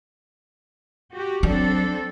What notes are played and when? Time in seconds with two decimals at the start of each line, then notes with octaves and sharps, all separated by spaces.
1.11 F#4 G4
1.43 F#3 C4 D4 A4